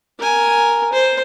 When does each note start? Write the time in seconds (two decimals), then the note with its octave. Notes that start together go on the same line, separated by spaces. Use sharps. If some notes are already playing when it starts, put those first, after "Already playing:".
0.18 A#4 G#5
0.93 C5